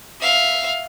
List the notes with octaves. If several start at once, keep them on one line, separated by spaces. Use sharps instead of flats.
E5 F5